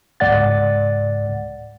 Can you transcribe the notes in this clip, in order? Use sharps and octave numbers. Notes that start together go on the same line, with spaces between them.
C#2 G#2 D5 F#5 A6